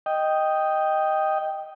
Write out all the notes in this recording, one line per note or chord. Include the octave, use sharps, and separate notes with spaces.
D#5 G5